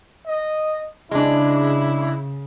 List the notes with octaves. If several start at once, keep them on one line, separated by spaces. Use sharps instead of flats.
D#5
C#3 G#3 D4 E4